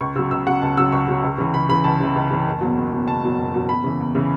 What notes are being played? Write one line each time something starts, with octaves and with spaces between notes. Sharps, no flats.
C#2 C#6
C#3 F#3 E6
C#2 E6
C#3 F#3 F#5
C#2 A5
C#3 F#3 E6
C#2 C#6
C#3 F#3
C#2
C#3 E3
C#2 B5
C#3 E3 B5
C#2 A5
C#3 E3
C#2
C#3 E3
F#1
E2 B2 F#3
F#1
E2 B2 F#3
F#1 A5
E2 B2 F#3
F#1
E2 B2 F#3
E2 B5
C#3 E3
E2
C#3 E3